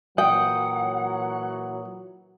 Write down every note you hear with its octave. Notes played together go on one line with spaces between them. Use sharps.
A#2 E3 F#3 F#5 G5 D#6